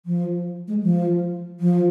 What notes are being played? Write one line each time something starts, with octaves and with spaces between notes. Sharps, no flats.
F3
G#3
F3
F3